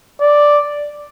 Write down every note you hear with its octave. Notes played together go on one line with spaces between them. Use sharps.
D5